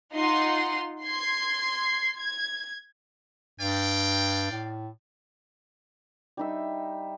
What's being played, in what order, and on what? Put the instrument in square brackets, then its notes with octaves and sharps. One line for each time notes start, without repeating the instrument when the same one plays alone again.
[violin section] D#4 F4 F#5 C6
C6 G#6 C7
G#6
[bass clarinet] G2 [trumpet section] D5 F5 G5
[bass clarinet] A2
[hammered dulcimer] G3 D#4 E5